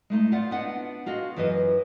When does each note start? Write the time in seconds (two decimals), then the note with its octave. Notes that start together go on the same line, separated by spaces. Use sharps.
0.10 G#3 A3 D#4
0.32 F4 D5 E5 F#5
0.51 B3 D4 D#5 F#5
1.06 F4 F#4 G#4 D#5
1.36 F#2 E3 G#4 B4 D#5